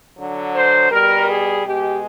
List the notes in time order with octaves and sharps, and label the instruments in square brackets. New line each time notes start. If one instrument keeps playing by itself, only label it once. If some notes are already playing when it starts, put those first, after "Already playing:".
[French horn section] D3 F#3
C5
B2 G3 A#4
G#4
B2 G#3 G4